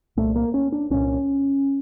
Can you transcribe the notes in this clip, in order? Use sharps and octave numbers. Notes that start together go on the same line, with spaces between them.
C2 A#2 A3
A#3
C#4
D4
C2 A#2 C#4